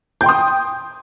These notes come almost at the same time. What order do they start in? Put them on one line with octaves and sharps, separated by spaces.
G6 G5 C6 D#6